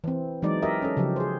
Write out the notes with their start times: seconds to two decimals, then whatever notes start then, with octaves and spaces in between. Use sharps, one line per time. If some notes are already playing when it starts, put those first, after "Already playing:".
0.04 E3 C4
0.42 E3 F#3 G#3 D#4 D5
0.62 G4 A#4 D#5 E5
0.82 C#4 A4
0.97 C#3 F3 F#3 G4
1.16 G#4 C5